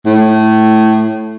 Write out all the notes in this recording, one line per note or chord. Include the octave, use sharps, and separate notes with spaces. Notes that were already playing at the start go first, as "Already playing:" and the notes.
A2